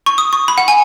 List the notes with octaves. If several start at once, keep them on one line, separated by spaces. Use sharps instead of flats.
C#6
D#6
C#6
B5
F#5
G#5